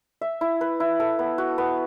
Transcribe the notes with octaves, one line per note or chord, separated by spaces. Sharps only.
E5
E4
B4
E4
A4
B3
F#4
B3